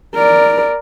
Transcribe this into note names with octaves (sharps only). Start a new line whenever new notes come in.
A#4 D5